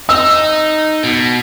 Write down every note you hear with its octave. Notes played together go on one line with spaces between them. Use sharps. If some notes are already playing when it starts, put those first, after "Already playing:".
D#4 E6
B2